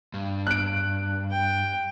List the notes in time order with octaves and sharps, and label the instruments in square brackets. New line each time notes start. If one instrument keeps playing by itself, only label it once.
[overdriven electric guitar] G2
[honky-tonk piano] F#6 D7
[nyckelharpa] G5